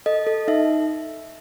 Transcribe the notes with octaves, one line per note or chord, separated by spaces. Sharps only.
A4 D#5
A4
D#4 E5